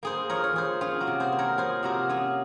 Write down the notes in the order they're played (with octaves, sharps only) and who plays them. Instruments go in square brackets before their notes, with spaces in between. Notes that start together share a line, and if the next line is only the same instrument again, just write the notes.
[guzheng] A#3 G#4 C5
F3 A#4 C#5
C#5
F3 G#4 C5
C#4 F4 G#4
F#4 A#4
C3
G#4 C5
A#3
A#4 C#5
F3 G#4 C5
C3 F#4 A#4
C#4 F4 G#4